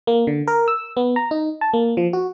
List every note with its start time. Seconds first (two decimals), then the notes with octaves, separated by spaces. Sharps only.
0.07 A#3
0.27 D3
0.47 A#4
0.68 E6
0.97 B3
1.16 A#5
1.31 D#4
1.61 A5
1.73 A#3
1.97 F3
2.13 F#4